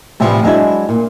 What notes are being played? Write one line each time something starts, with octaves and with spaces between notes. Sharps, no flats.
A2 C3 E3 F3 G3
F#3 G#3 D4 E4
A#2